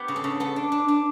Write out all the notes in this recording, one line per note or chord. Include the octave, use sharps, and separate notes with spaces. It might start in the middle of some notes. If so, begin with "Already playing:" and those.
Already playing: B3 G4
C#3
A4
C#3
B3 A4
D4
D4
D4